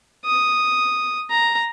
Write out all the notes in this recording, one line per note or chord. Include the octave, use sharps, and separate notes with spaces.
D#6
A#5